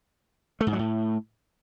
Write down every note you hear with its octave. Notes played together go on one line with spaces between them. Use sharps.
A3
G#2
F#3
A2